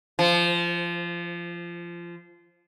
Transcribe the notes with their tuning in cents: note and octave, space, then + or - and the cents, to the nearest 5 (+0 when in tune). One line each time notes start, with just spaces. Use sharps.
F3 -20